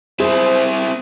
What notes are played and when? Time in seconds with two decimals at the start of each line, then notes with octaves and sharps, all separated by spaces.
0.20 C4 E4 G#4 C5